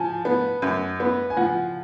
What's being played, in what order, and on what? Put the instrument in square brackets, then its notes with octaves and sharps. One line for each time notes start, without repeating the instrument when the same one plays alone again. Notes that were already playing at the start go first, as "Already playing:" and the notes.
Already playing: [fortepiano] F3 [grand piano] G#5 A5
[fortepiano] B3
F#2
B3
[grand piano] G#5
[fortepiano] F3 [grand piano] F#5